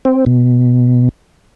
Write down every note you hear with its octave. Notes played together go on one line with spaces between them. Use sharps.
C4
B2